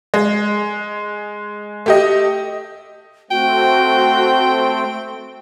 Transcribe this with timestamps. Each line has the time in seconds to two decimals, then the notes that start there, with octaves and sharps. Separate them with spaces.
0.14 G#3
1.86 A3 G4 D#5
3.31 A3 C4 F#4 G5